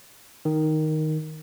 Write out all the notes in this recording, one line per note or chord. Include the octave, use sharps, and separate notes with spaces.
D#3